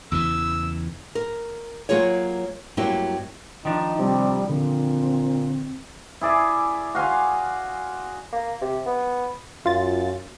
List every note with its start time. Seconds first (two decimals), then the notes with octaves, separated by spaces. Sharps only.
0.12 E2 C#3 E3 E6
1.15 A#4
1.89 F#3 A#3 F4 G#4 C#5
2.77 G2 F#3 A#3 C4 E4 G4
3.65 D#3 F3 D4 D#4
3.99 C3 G3
4.49 A#2 D3 C4
6.21 E4 G#4 D5 E5
6.95 F#4 F5 G#5 C6
8.32 A#3
8.62 C3
8.86 B3
9.66 F#2 F4 A6